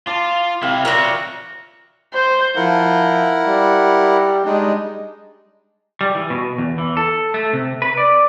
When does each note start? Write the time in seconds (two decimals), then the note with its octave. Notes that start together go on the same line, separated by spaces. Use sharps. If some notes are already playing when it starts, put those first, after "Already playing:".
0.07 F4 A5 D6
0.62 C3 E4 F5 G5
0.85 F4 F#4 A#4 C#5 D5 E5
2.13 C5
2.56 F3 E4 A#4 F#5
3.44 G3
4.46 G3 G#3 D4 D#4
6.01 G3
6.15 E3
6.30 B2
6.58 E2
6.78 E3
6.97 A4
7.34 A3
7.53 C3
7.82 B4
7.97 D5